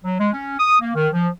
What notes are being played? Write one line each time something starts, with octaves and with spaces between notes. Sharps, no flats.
F#3
G#3
C#4
D#6
A#3
D#3
F3